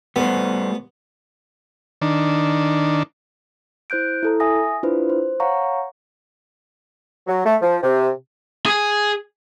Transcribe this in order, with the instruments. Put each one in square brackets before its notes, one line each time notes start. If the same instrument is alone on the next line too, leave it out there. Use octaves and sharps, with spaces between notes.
[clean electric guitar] G3 A3 C5 [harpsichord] B3
[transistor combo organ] D#3 D4
[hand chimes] E4 C5 F#6 G6 D7
E4 A4 A#5
E5 G#5 D#6 A#6
D4 E4 F4 B4 C5
C5
C#5 F5 F#5 A#5 C#6
[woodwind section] F#3
A3
F3
C3
[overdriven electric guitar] G#4 G#5